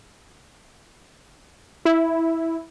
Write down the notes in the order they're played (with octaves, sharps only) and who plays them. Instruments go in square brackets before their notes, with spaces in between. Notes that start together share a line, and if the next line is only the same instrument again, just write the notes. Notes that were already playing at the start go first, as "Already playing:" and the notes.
[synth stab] E4